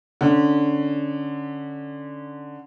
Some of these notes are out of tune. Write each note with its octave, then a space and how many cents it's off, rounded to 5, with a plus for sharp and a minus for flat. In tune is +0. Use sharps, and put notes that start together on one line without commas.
D3 +5 C#4 +0